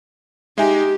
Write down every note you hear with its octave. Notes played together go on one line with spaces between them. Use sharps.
G#3 D#4 G4 E5 G#5